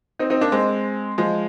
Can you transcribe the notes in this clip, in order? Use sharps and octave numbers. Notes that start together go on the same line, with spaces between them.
C4 D#4
C4 D#4
A#3 D4
G#3 C4
F3 G#3